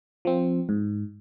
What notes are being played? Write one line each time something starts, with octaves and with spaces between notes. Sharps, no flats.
F3 C4
G#2